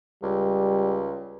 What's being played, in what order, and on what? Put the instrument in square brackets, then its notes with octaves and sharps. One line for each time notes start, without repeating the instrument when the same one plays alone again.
[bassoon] C#2 [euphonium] G3